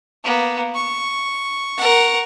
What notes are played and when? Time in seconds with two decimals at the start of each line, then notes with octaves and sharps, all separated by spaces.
0.24 A#3 B3
0.75 C#6
1.77 A#4 F#5